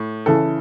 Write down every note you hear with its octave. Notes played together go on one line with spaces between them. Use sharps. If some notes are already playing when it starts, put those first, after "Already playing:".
Already playing: A2
C#3 E3 A4